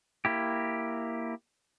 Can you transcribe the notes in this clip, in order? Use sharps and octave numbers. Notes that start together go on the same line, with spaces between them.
A#3 E4 G4